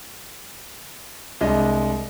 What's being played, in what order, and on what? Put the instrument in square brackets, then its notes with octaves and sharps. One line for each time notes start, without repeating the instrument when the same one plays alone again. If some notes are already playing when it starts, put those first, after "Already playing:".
[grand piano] C2 G#3 D4 D#5